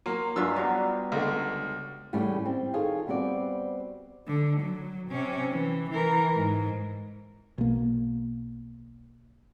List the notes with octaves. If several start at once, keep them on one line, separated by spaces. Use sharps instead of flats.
F#3 A#3 C6
G2 F#3 G#3 D4 F4 E5 E6
F#3 G3 B3 A#4
C#2 D3 C6
E2 A2 G3 A3 C#4
C4
D#3 F4 G#4 A4 C#5
G3 B3 C4 F#4 D5
D3
F#3
C3 C#4
E3
E3 A#4
G#2
B1 A#3